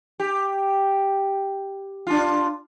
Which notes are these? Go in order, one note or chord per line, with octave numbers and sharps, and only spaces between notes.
G4
D4 F4